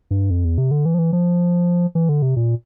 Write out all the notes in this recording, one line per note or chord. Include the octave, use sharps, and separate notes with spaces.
G2
F2
E2
C3
D3
E3
F3
E3
F3
E3
D3
C3
A#2